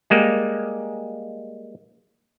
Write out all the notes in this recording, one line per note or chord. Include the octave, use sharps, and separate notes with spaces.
G3 G#3 A#3